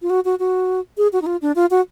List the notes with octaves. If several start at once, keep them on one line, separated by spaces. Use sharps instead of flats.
F4
F#4
F#4
F#4
G#4
F#4
D#4
F4
D4
F4
F#4